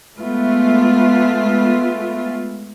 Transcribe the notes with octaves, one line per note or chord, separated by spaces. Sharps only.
G#3 A3 B3 F4